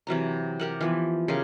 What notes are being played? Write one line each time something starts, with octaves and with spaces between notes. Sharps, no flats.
C3 E3 F#3 A#5
G4 A#4 F#5
E3 F3 B3
C#3 F4 G4 A#4